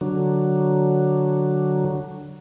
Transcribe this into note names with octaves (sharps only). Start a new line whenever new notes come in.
D3 F#3